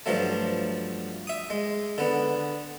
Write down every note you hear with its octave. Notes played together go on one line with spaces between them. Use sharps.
G2 F3 F#3 A3
E5 D#6
G#3
D3 B3